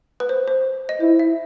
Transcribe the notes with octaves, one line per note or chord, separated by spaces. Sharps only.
B4
C5
C5
D#5
E4 C5
E5